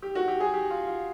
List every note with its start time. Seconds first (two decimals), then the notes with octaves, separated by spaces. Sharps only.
0.02 G4
0.15 F#4
0.28 G4
0.40 G#4
0.53 G4
0.70 F4
0.87 F4